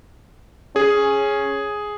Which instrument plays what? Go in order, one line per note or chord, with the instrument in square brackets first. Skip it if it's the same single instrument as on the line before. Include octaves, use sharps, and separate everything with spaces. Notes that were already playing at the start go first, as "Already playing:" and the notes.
[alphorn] C#4 [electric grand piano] G#4